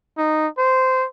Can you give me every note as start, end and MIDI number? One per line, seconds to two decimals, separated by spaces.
0.18 0.48 63
0.58 1.07 72